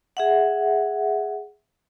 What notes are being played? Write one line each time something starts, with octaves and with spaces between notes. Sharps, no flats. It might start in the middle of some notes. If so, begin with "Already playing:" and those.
G#4 E5 F#5